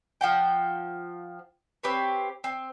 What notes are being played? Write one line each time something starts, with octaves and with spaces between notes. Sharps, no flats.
F3 F#5 G5
C4 G4 B4 C#5
C4